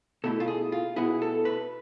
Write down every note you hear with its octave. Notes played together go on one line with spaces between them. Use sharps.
B2 A3 E4 A4
F4
G#4
F4
B2 B3 E4 G#4
A4
B4